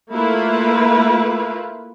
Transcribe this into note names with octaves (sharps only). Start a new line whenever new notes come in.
A3 A#3 E4 F4 B4